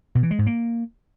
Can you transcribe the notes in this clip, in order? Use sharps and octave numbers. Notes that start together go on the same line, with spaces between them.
B2
E3
G#3
G#2
A#3